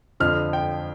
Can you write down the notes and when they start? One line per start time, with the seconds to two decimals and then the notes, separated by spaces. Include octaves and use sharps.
0.20 F2 D3 F3 F6
0.53 G5